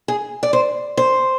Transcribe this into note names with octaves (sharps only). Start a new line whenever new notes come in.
G#4
D5
C5
C5